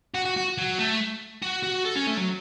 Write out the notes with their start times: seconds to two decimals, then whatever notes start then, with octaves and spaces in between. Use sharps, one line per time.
0.15 F#4
0.25 F#4
0.37 F#4
0.58 F#3
0.79 A3
1.42 F#4
1.63 F#4
1.85 A4
1.95 C#4
2.07 A3
2.17 F#3